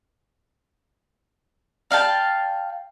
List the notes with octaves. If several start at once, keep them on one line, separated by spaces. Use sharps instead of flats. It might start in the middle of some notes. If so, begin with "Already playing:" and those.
D5 F5 G5 A5